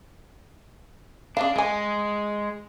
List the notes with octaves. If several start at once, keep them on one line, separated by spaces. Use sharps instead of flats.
C#3 D4 D#5 F5
G#3 D#5 G#5